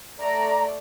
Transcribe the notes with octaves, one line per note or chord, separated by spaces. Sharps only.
A3 D5 A#5